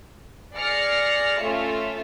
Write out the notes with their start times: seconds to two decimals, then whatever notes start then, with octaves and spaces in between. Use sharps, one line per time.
0.56 G#4 D5 F6 A#6 C7 C#7
1.41 A3 C#4 F4 E5